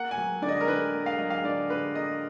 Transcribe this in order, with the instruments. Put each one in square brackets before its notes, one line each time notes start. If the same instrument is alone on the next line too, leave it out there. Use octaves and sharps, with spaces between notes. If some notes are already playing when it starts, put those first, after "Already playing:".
Already playing: [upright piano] A#3 F#5
G#5
F#3
D3 D5
D#5
A#4
D3 B4
A#3
F5
F#3 D#5
F5
D3 D5
D3 B4
A#3 D#5